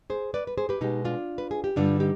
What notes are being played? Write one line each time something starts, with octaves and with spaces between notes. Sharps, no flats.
G#4 C5
B4 D5
B4
G#4 C5
G4 B4
B2 G#3 D#4 G4
D4 F4
B4
G#4
G4
G2 D3 G3 D4 F4
D#4 G4